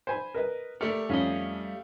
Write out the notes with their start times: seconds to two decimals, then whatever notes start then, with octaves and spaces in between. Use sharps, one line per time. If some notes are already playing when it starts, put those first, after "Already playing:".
0.07 C5 G#5 B5
0.34 A#4 B4 D#5
0.81 A3 G4 A4 A#4 D5 F6
1.09 F2 G3 C#4 D#5 F5